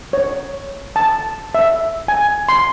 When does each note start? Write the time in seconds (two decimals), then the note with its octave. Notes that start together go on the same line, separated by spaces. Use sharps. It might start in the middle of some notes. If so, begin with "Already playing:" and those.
0.13 C#5
0.96 A5
1.55 E5
2.08 G#5
2.49 C6